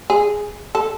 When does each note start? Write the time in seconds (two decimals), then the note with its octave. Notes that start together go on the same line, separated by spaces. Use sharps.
0.10 G#4
0.75 A4